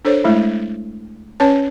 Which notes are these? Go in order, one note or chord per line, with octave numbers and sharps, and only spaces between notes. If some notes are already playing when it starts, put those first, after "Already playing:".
D4 A4 C5 C#5
G#3 A3 E4
C#4 B4 C#5 A5